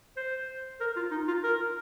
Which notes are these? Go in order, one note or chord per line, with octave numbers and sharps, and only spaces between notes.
C5
A#4
F4
D#4
F4
A#4